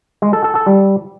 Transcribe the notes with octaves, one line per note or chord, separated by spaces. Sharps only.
G#3
A4
A4
A4
G3